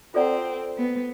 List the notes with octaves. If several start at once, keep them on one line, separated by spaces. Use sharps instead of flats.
C4 F4 A4 D5 F#5 A#5
B3